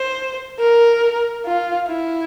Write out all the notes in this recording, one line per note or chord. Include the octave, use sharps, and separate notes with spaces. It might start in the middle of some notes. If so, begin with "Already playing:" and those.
Already playing: C5
A#4
F4
E4